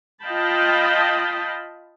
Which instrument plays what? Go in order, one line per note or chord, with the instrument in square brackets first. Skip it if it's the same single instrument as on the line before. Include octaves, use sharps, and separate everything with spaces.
[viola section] F4 D#5 F5 G5 A5 B5